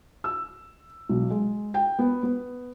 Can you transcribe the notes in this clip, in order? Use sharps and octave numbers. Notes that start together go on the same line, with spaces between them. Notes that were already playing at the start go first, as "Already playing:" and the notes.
E6
B1
G#3
G5
B3
B3